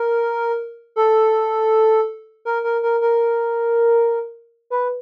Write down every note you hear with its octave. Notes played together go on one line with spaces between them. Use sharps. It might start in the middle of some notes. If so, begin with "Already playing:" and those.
Already playing: A#4
A4
A#4
A#4
A#4
A#4
B4